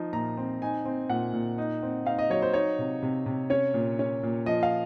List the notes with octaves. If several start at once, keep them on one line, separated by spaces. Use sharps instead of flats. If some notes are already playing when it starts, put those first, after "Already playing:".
Already playing: F3 D#4
A#2 A#5
C4
D#4 G#5
C4
A#2 F#5
A#2
D#4
C4
D#4 F5
D#5
F#3 C#5
C5
D#4 C#5
C3
C3
C3
C#4 C#5
A#2
C#4
A#2
F3 D#5
F5